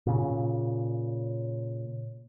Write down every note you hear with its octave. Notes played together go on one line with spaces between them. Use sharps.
A#2 C#3